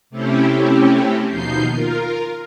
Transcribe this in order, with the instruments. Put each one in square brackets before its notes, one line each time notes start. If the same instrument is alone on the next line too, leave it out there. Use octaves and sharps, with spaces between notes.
[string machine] C3 A3 C4 C#4 E4 G4
D#2 B2 F3 D#4 G6 C7
F4 A#4